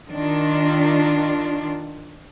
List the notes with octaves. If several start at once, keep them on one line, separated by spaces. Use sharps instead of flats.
D#3 D4 F4